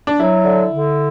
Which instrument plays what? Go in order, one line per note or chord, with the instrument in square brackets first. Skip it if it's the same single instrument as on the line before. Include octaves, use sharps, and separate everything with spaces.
[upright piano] D4
[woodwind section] F#3 [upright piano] E4
[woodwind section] D3
D3